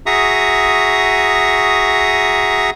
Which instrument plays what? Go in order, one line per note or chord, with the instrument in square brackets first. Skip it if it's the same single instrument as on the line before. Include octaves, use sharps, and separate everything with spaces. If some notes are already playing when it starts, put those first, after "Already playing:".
[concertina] F#4 G#4 E5 A#5 C#6 D#6